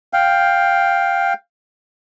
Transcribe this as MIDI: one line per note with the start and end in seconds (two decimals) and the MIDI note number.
0.13 1.33 77
0.13 1.33 79